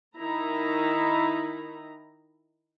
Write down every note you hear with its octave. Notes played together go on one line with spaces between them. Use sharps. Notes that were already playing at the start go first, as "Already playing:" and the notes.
D#3 D#4 E4 A#5